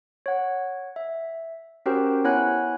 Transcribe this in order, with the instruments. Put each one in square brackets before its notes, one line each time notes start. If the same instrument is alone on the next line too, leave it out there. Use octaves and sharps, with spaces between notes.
[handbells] C#5 F#5
E5
C#4 F#4 G4 A#4 C5 G5
B3 E4 C#5 F#5 G#5 F#6